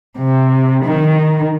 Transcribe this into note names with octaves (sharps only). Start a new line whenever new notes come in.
C3
D#3